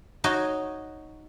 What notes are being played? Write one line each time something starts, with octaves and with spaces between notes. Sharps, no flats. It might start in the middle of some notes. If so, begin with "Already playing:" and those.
D#4 F#4 C#5 D#5